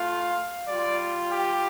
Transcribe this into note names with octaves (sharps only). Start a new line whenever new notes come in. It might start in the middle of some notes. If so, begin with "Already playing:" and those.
Already playing: A3 F4 F5
G3 F4 D5
G4